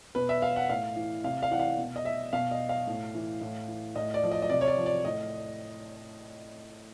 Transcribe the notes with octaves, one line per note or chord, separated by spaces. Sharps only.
B2 B4
E5
F5
F#5
A2 F5
E3
C3 F5
F5
E3 F#5
F5
B2
D#5
E5
B2 F5
D#5
F5
A2
E3
A2
E3
A2 D#5
D5
F3
D#5
D#5
C3 D5
C#5
D5
F3
D5
A2 D#5